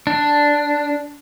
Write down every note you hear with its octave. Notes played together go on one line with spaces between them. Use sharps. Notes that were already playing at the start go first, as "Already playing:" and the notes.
D4